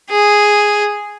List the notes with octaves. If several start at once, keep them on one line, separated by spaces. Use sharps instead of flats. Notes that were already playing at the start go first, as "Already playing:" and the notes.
G#4